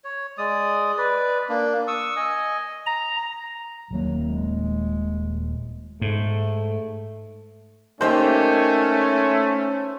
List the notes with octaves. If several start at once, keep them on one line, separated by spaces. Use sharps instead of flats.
C#5
G#3 D5 D#6
B4 D5
A#3 D4
C#6 D#6 E6
D#5 G#5
A#5
D#1 D#2 F#3 A#3
G#3
G#2 A3
A3 A#3 C#4 D#4 G4 C5